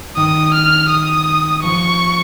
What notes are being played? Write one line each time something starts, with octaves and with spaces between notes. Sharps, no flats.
D#3 D#6
F6
D#6
F3 C#6